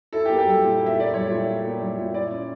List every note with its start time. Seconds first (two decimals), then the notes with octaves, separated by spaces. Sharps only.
0.13 E4 A4
0.25 G4
0.30 A#3
0.38 G4
0.46 G3 A4
0.63 A#2 A4
0.80 E4
0.86 E5
0.97 A#3 D5
1.14 G3 C#5
1.31 A#2
1.47 E4
1.64 A#3
1.81 G3
1.98 A#2
2.14 E4 D5
2.31 C#4